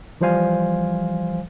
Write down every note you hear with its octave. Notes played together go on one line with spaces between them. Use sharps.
E3 F3 G3 C5 F5 G#5